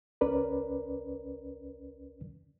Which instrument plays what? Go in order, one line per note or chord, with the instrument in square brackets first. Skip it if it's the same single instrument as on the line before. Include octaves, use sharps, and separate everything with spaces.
[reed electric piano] C#2 C#4 A#4 B4 D5